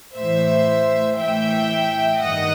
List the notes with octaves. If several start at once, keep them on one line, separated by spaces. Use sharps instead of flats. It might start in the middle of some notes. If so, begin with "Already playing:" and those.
A2 E3 C5 E5
A2 E3 E5 G5
G2 D#3 D#5 F#5